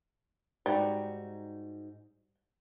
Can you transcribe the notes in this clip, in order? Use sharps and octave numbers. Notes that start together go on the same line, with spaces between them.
G#2 G3 D#4 F#4